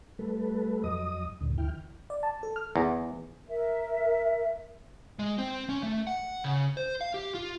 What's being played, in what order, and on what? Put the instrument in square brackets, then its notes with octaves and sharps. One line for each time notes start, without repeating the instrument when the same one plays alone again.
[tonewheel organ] G3 A3 A4 B4
F2 F#3 D#5 D#6
D2 G2 A#2 D3
D2 E3 E4 G5 F6
[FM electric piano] D5
A5
A4
F6
[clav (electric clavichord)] E2
[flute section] A#4 E5
[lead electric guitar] G#3
C4
C#4
A3
F#5
C#3
C5
F5
G4
F4